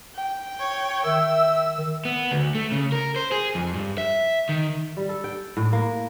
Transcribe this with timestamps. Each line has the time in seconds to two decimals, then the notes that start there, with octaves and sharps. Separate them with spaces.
0.15 G5
0.60 C#5
1.05 D#3 E5 E6
2.05 B3
2.31 D2
2.55 A3
2.72 C#3
2.92 A#4
3.16 C5
3.32 G#4
3.55 F2
3.75 G2
3.98 E5
4.49 D#3
4.97 G3
5.09 A4
5.24 G5
5.57 A2
5.73 A#3